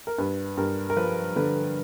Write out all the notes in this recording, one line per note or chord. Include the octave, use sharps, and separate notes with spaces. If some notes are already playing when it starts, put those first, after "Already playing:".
A#4
G2 B4
G2 A#4
A#4
F3 B4
D3 B4